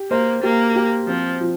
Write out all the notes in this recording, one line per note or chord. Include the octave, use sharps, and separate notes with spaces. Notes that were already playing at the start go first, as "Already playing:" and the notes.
Already playing: G4
A#3 C5
A#3 G4
G4
F3 C4
F3